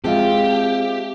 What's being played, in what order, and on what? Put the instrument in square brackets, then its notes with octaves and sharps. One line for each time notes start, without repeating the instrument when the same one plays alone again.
[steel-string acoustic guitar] G#3 F4 A5 [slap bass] C4 [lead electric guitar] G4 [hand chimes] G#4 E5 F5